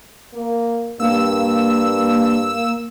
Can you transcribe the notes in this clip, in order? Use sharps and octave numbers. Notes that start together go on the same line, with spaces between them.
A#3
G2 A#3 E6